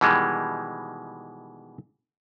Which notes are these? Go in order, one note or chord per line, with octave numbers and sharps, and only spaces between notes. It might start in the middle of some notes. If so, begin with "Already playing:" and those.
B2 D#3 E3 G3 G#3